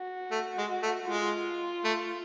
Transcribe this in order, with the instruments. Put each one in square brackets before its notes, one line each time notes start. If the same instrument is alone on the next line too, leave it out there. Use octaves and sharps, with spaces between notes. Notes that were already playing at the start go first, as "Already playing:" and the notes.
Already playing: [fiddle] F#4
[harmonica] A3
G#3
A3
[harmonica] G#3 [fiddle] F4
[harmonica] A3